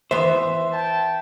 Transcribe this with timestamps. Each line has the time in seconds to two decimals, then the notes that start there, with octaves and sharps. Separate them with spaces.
0.11 E3 B3 C5 E5
0.73 G5 A5